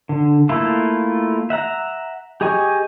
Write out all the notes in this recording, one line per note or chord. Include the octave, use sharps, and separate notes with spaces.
D3
A3 A#3 E4 F4 A4
E5 F#5 A#5
G4 G#4 D#5 G#5 C#6